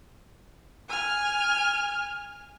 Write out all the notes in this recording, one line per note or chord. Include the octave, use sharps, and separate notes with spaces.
G#5 F6